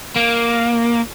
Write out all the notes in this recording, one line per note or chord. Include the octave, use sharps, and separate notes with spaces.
A#3